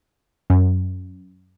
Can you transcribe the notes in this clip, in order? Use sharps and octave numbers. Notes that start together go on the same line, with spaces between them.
F#2